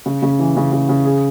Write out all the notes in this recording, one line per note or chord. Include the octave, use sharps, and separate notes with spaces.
C#3
C#3
E3
C#3
C#3
C#3
G#4